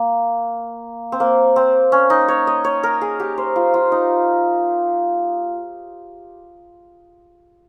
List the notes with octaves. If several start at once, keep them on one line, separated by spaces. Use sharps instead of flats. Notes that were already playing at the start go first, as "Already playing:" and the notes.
Already playing: A#3
C4
A#3
C4
C#4
D#4
C#5
D#5
C#5
A#4
G#4
G4
C5
F4
F4
D#4